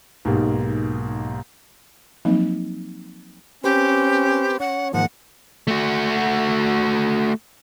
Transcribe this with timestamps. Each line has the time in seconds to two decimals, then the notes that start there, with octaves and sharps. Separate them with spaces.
0.25 B1 G#2 A#3 G4
2.25 F3 F#3 A#3 C4 D#4
3.64 C4 C#4 G4 B4 C5
4.60 C#4 C#5 F#5
4.93 G#2 D#3 F3 A#3 F#5
5.68 A3 F#4